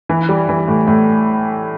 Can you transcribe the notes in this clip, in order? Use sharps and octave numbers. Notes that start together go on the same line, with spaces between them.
E3
G3
E3
A2
A2